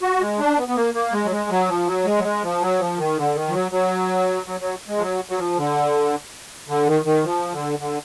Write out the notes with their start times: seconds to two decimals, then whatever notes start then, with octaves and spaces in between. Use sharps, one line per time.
0.02 F#4
0.20 G#3
0.39 D4
0.58 B3
0.68 B3
0.76 A#3
0.94 A#3
1.12 G#3
1.25 F#3
1.31 G#3
1.50 F#3
1.68 F3
1.86 F#3
2.05 G#3
2.18 F#3
2.24 G#3
2.43 F3
2.61 F#3
2.79 F3
2.98 D#3
3.17 D3
3.35 D#3
3.48 F3
3.53 F#3
3.71 F#3
4.46 F#3
4.61 F#3
4.88 G#3
4.97 F3
5.01 F#3
5.29 F#3
5.38 F3
5.57 D3
6.68 D3
6.87 D#3
7.05 D#3
7.24 F3
7.52 D3
7.79 D3